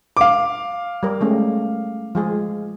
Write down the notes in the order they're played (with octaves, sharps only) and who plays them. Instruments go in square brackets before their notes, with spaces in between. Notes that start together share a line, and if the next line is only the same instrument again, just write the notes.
[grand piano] F5 D6
[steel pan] G3 A#4
G#3 A3 C#4
F3 G#3 G#4